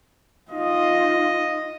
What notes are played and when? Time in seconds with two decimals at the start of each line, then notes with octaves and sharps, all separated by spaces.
0.50 D#4 F4 D#5